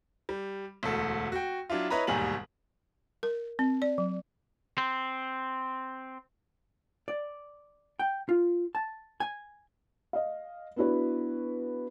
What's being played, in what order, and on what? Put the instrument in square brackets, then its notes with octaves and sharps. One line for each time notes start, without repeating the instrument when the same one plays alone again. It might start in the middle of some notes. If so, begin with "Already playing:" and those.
[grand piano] G3
E1 D2 A4
F#4 G5
F#3 D4 E4 F4
E4 B4 C#5 D#5 A#5 B5
E1 D#2 G#2 G3 G#5 F#7
[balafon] A#4
C4
D5
F#3
[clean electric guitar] C4
[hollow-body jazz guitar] D5
G5
F4
A5
G#5
[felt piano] D#5 F5
B3 D4 E4 F#4 B4